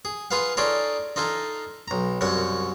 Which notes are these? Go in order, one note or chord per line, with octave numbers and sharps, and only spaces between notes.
G#4
F4 G#4 B4 F5 F#5
D#4 F4 G#4 A4 C#5 D5
D#4 F4 A4 G#5 A#5
B1 A#5
C2 F#2 F#3 F#5 C#6